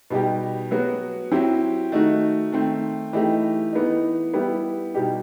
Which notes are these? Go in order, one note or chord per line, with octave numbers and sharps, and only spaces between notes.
B2 G3 D#4 G4
F#3 B3 F#4
F#3 C4 E4 G4
D#3 A3 D#4 F#4
D#3 A3 C4
E3 A3 D#4 G4
E3 B3 D#4
G3 B3 E4 G4
B2 G3 D#4 G4